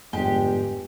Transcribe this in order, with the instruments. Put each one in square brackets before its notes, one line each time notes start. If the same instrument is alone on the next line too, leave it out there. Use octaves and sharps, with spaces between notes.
[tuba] G1 [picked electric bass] F2 G#2 [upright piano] G#3 [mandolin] G4